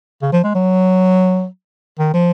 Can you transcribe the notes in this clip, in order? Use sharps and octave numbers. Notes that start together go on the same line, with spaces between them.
C#3
F3
G#3
F#3
D#3
F3